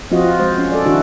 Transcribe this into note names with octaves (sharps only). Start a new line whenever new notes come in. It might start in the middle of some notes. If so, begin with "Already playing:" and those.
F3 C4 F4 F#4 D#5
F4
G#3 C5
C#4
A4 D5
D#3 D4 E4 F#4